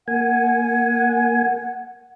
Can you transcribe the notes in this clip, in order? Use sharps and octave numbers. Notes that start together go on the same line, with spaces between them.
A#3 F#5 G#5